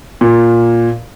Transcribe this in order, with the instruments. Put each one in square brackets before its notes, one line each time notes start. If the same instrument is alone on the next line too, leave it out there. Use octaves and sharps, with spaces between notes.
[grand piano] A#2